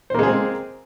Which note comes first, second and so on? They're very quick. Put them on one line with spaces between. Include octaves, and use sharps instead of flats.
C5 A#3 G#3 G#4 C4